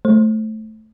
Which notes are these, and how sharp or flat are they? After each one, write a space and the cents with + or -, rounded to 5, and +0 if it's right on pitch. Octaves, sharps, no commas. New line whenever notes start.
A3 -10 C5 +15